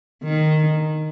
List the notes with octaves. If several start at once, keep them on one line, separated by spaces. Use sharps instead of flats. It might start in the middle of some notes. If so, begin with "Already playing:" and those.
D#3